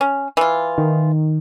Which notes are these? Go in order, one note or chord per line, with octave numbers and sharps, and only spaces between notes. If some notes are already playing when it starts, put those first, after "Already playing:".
C#4
E3 F4
D#3